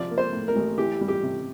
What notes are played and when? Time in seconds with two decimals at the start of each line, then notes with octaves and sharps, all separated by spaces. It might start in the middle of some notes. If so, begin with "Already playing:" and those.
Already playing: C3 F3 D5
0.11 A#3
0.18 C5
0.33 A2
0.48 A#4
0.56 A1
0.78 E3 G4
1.01 G3
1.08 G4
1.23 C3